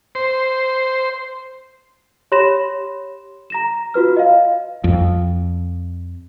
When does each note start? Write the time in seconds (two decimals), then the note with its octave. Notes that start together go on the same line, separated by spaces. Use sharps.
0.15 C5
2.32 G4 C#5 B5 C6 A#6 E7
3.50 A#5 A#6 E7
3.94 F4 F#4 B4 F6
4.17 D#5 F5
4.84 F2